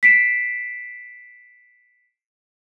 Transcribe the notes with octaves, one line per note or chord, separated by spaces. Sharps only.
B6 C7 D7 E7